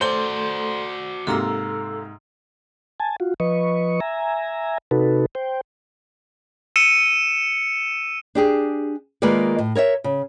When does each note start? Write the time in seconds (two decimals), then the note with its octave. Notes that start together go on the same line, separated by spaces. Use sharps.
0.01 A3 F#4 A4 C5 D5 C6 G7
1.27 G#2 C3 A#3 A4 A#5 E6
3.00 G#5 A5
3.20 F4 F#4
3.40 F3 B4 D#5 C#6
4.00 E5 G#5 A#5
4.91 C3 D#4 F#4 A4 B4
5.35 C5 G5
6.76 E6 C#7 D#7 E7
8.35 D4 G4 G#4
9.22 D#3 G#3 A#3 F4 B4 D5
9.59 A2
9.75 A#4 C#5 D#5 E5
10.04 C#3